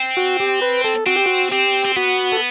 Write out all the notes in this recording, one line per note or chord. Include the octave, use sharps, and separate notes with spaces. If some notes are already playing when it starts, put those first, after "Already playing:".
Already playing: C4
F#4
G4
B4
A4
C4 F#4
G4
F#4
C4 G4
C4
B3 F#4
A4